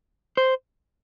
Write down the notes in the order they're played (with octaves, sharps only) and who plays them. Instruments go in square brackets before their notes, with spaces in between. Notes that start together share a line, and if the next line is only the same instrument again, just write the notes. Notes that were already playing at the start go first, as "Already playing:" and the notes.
[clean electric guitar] C5